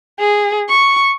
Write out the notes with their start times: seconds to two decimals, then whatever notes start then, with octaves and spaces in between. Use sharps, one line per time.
0.20 G#4
0.69 C#6